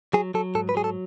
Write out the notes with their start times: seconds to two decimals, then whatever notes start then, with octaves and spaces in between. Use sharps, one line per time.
0.13 F#3 G#4
0.34 F#3 A4
0.55 G#2 A4
0.69 B4
0.75 F#3 G#4
0.84 A4